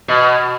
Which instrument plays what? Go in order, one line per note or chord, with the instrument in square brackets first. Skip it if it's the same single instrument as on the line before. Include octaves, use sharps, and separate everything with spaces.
[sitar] B2